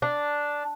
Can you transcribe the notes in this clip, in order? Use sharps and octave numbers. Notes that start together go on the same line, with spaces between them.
D4